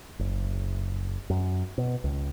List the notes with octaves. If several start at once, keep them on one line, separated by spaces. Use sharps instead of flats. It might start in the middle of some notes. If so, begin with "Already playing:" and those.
F#1
F#2
B2
C#2